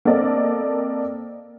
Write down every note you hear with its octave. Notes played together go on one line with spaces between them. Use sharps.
A#3 C4 A4 D5 D#5